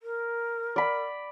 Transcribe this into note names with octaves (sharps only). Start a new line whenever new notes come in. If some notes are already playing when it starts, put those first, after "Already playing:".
A#4
D5 B5